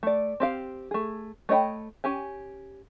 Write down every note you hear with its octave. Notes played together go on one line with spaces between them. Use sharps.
A3 D5
C4 G4 F5
A3 G#4
A3 C#5 D#5 G5 B5
C#4 G4 G#5